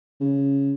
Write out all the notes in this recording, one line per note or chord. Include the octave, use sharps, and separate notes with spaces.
C#3